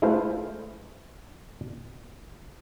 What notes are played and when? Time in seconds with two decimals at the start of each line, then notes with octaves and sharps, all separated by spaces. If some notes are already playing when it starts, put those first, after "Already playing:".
0.02 G#3 A3 E4 F4 B4 C5